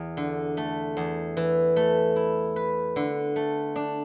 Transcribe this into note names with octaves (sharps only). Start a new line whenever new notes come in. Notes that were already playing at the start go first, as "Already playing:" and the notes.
Already playing: E2
D3
A3
E2
E3
A3
E4
B4
D3
A3
D4